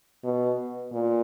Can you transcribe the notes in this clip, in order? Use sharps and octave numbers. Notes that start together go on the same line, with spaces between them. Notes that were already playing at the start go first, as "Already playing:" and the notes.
B2
A#2